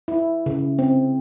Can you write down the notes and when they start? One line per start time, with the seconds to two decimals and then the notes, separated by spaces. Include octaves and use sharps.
0.08 E4
0.46 C#3
0.79 C4